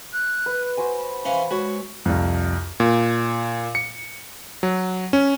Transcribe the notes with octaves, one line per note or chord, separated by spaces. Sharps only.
F#6
B4
F#4 C5 G#5
B5
E3 C#4 C5 F5 G#5
G#3 F#4 C#5
C2 F2
A#2
C#7
F#3
C#4